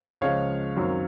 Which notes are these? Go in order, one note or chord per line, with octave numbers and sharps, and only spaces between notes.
C#2 C#3 F3 G#3 C#5 F5
F#2 D#3 F#3 C4